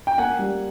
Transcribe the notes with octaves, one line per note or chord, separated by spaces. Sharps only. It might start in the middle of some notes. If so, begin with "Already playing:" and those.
G5
A#3 F#5 G#5
G3